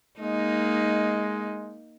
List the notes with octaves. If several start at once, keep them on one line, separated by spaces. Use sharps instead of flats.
G#3 A#3 D#4